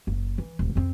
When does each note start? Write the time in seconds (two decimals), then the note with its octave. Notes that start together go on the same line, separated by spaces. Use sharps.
0.07 F#1
0.38 E3
0.59 D#1
0.75 F2 C4